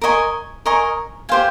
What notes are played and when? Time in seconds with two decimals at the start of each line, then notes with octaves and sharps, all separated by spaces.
0.02 A#4 D#5 G#5 C#6
0.66 A#4 D#5 G#5 C#6
1.29 G4 C5 F5 G#5